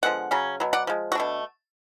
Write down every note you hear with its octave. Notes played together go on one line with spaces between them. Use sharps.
D3 F3 G#3 B3 F#5
C#3 F#3 C#4
B2 F#3
D5 F#5
F3 G#3
F#4
B2 A3 D4